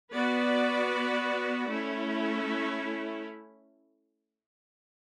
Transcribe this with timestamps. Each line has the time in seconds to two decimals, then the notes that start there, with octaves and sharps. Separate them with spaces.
0.10 B3 F#4 B4 D5
1.68 A3 C#4 E4